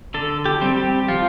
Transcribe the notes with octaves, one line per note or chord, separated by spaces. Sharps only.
D3 A4
G4
G3 C4
G4
F3 F4